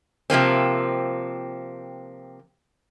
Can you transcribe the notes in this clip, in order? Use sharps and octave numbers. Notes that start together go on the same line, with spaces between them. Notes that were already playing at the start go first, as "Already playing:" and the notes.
C3 F3 A#3 C4